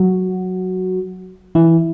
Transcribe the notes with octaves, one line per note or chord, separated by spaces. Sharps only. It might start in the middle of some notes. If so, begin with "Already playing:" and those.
Already playing: F#3 F#4
E3 E4